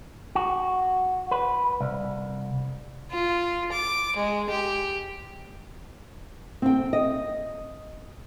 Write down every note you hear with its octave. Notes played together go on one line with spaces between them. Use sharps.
F#4
B4
C2
F4
D6
G#3
G4
C4 G5
D#5